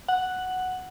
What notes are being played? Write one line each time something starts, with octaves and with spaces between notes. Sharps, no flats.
F#5